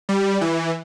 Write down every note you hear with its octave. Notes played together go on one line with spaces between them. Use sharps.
G3
E3